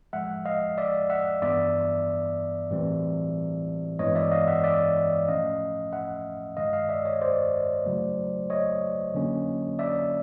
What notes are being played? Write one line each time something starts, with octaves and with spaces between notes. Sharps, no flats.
A2 F3 G#3 E5 F#5
D#5 F5
D5 E5
E5 F#5
G2 E3 G3 B3 D5 E5
A2 E3 G3 C4
G2 E3 G#3 B3 C#5 D#5
D5 E5
D#5 F5
E5 F#5
D5 E5
A2 F3 A3 C#4 D#5 F5
E5 F#5
G2 D#3 G#3 D#5 F5
D#5 F5
D5 E5
C#5 D#5
C5 D5
C#3 F#3 A3
C#5 D#5
D3 F#3 A#3 C#4
D5 E5